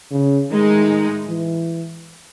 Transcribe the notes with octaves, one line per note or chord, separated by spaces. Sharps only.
C#3
A2 D#3 G#3 D#4
E3